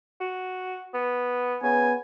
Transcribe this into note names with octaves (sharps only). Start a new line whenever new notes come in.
F#4
B3
C#3 B3 G#5